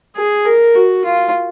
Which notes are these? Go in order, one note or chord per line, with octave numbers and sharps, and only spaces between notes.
G#4
A#4
F#4
F4